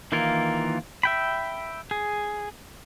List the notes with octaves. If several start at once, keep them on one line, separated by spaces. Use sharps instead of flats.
D#3 E3 A#3 F4 A#4
E5 G5 B5
G#4